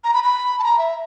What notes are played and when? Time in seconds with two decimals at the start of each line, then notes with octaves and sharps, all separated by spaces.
0.04 A#5
0.14 B5
0.24 B5
0.59 A5
0.64 A#5
0.78 E5